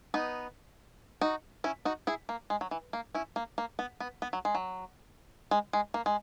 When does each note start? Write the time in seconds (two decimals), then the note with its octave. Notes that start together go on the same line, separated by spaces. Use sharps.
0.14 B3 D#4
1.21 D#4 F#4
1.64 C#4 E4
1.85 D#4 F#4
2.07 E4 G#4
2.29 A#3
2.50 G#3
2.61 F#3
2.71 E3
2.93 A#3
3.14 C#4 E4
3.36 A#3
3.58 A#3
3.79 B3
4.00 B3
4.22 B3
4.33 F#3
4.45 G#3
4.55 F#3
5.51 G#3
5.73 G#3
5.94 A#3
6.06 G#3